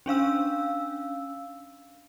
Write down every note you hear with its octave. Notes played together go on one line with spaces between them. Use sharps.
C#4 D4 F5 E6